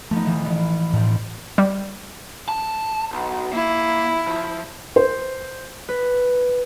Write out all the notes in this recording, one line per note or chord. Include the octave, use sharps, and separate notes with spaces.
F3 A3 B3 D#4
D#1 E3
A1
E1 A2 C4
G3
A5
B1
A#3 E4
F3
C5
B4